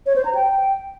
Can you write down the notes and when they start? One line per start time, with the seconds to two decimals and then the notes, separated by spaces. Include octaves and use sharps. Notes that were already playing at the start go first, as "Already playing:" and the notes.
0.06 C#5
0.16 C5
0.25 A#5
0.35 G5